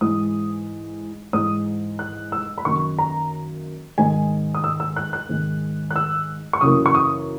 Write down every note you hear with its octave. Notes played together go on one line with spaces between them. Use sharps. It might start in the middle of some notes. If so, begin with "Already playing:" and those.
G#2 E3 G#3 D#6
G#2 E3 G#3 D#6
F#6
E6
B5
F#2 D#3 A#3 C#6
A#5
G#2 D#3 G#3 G#5
D#6
E6
E6
F#6
F#6
G#2 D#3 G#3
F#6
E6
C#6
F#2 C#3 E3 A#3 D#6
C#6
D#6